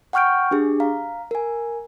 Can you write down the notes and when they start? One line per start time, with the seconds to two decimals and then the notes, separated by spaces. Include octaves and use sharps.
0.13 F#5 G5 C#6 F6 G6 D7
0.51 D4 G4 G#4
0.80 F5 A#5
1.31 A#4 G#5